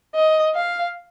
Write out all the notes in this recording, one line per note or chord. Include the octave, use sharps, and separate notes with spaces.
D#5
F5